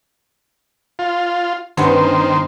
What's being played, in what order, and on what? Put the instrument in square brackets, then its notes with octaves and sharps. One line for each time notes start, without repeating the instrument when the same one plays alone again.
[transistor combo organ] F4
[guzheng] G2 B3 C#4 [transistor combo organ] D#3 C5